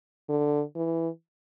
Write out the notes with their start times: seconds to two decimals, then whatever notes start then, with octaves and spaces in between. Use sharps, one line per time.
0.29 D3
0.76 E3